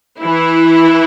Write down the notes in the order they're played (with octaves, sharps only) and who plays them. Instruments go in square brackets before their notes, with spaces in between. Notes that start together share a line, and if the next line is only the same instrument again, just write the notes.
[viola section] E3 E4